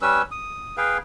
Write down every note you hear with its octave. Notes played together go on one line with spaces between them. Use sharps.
G3 C#4 B4 E6
D#6
G#4 B4 F5 G5